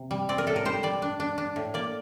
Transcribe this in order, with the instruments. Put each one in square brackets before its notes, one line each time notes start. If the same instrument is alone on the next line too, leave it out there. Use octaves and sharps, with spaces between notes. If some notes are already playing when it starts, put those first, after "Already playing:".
Already playing: [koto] C3
G3
C4 D5
A#4
A2 A4
A#4
G3 C5
G3 D5
D4
D4
D4
A2
A#3 D5